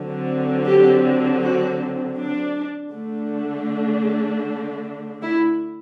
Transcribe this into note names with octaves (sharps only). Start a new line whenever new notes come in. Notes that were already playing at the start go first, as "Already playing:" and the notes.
Already playing: D3 F#3 C4
G4
F#4
D4
D3 A3 D4
E4